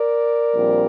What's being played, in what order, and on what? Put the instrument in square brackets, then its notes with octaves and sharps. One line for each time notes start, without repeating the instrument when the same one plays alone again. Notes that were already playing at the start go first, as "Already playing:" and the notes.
Already playing: [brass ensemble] A#4 D5
A#1 A#2 G3 C4